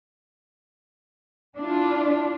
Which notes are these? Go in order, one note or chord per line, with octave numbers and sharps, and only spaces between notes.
D4 E4 F4